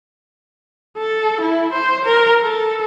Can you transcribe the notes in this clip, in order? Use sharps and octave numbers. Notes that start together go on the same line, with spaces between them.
A4
E4
C5
A#4
A4